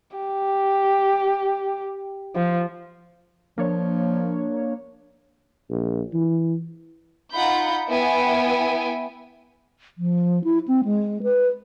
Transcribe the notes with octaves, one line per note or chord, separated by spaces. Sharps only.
G4
F3
F3 A#3 D4 C#5
A#1
E3
D#4 F4 F#5 B5 G6
B3 E4 G5 G#5
F3
E4
C4
G#3
B4